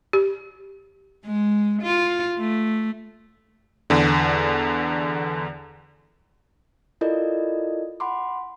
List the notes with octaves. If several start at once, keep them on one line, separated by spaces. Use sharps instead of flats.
G4
G#3
F4
A3
E2 D3
E4 F4 A4 A#4 D5 D#5
F#5 B5 C6 D6